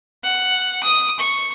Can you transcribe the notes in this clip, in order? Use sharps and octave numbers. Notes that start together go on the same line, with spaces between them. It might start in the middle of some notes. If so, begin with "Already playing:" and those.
F#5
D#6
C#6